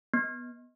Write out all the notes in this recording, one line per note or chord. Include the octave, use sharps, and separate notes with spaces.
B3